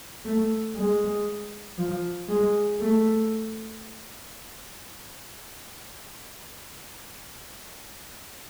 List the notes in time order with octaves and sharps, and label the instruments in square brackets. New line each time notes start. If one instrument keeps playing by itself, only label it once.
[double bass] A3
G#3
F3
G#3
A3